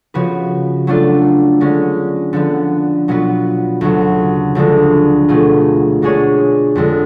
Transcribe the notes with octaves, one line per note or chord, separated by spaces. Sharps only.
C#3 F3 B3 F#4 B4
F#3 A3 D4 F4
D3 G#3 C#4
D3 F3 B3
B2 F#3 B3 F4 B4
D2 C#3 F#3
D2 D3 F3 G#3
B2 A3 F4 G#4
B2 G#3 D4 G#4 C#5
F2 D3 G#3